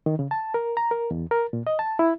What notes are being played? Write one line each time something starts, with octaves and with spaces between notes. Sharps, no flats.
D#3
C#3
A5
A#4
A#5
A#4
E2
A#4
A#2
D#5
A5
E4